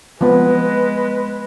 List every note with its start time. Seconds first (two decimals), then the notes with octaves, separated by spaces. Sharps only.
0.21 F3 G#3 B3 B4